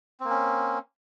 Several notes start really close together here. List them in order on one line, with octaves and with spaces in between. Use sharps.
C4 A#3 C#4